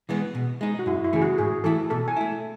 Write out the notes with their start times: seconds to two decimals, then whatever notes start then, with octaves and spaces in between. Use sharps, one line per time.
0.09 E3 G#3 B3
0.35 B2
0.61 G#3 D#4
0.79 F#4
0.86 F#2 E4
1.04 E4
1.13 C#3 E3 A3 G#4
1.22 F#4
1.38 G#2 G#4
1.64 E3 A3 E4 A4
1.90 B2 A4
2.08 G#5
2.16 A3 E4